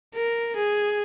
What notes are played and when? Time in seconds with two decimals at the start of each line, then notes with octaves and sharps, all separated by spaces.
0.15 A#4
0.56 G#4